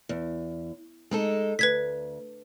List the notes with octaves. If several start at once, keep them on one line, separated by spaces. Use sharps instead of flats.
E2
G#3 D#4 A4
D2 B4 G#6 B6